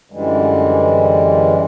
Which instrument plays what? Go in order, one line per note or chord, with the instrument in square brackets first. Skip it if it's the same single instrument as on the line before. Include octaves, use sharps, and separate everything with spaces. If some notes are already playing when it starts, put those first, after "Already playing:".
[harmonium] F#2 D3 E3 G3 G#3